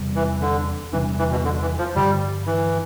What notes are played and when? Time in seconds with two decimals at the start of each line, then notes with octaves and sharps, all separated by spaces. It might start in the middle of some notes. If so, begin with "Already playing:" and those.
Already playing: E2 C3 G3
0.16 E3
0.41 D3
0.93 E2 C3 E3 G3 D4
1.19 E3
1.31 B2
1.45 D3
1.62 E3
1.79 F3
1.96 G2 D3 F3 G3
2.47 E3